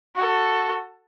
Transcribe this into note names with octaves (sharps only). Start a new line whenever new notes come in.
F#4 A4